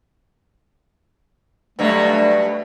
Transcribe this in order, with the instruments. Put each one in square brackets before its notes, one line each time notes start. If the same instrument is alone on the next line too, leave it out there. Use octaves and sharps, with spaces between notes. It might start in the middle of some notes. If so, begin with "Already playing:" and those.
[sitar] G2 B2 F#3 [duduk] A3